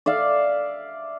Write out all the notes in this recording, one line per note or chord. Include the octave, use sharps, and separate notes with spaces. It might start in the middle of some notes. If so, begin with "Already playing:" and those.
D5 E5 F5